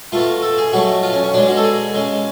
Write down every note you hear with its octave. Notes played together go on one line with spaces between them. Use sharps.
B2 A3 F4
A4
G#4
B2 F#3 A3 F#4
F4
C#4
C#4
B2 G#3 D4
F#4
A4
G#4
C#3 G#3